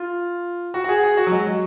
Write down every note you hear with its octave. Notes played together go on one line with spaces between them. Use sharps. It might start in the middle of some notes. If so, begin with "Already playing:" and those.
Already playing: F4
F#4
F#4
G#4
G#4
F#4
F#3
G#3
F#3